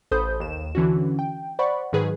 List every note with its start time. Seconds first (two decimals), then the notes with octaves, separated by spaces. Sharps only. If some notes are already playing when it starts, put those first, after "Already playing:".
0.11 A1 A4 C5 B5 D#6 G6
0.40 D#2 E7
0.75 D3 E3 C#4 F#4
1.19 G5
1.59 C5 D5 F#5 B5 C#6
1.93 G#2 D#3 F#3 G#4 B4